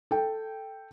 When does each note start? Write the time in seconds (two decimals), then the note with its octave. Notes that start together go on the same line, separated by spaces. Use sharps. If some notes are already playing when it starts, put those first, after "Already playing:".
0.11 A4 G5